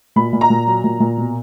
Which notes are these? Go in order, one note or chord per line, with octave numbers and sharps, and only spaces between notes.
A#2 B5
A#2
A#5
A#2
F#3
A#2
A#2
B2